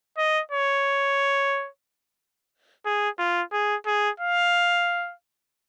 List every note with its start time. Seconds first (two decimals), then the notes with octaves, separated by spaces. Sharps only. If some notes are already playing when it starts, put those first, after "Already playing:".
0.18 D#5
0.51 C#5
2.86 G#4
3.19 F4
3.52 G#4
3.86 G#4
4.20 F5